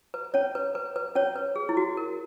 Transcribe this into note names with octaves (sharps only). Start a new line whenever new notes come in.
B4
C#4 C#5
B4
B4
B4
C#4 C#5
B4
G#4
E4
F#4
A#4